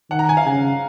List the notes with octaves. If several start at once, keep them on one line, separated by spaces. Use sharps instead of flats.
D#3 F#5
A#5
G#5
F5
C#3 G#5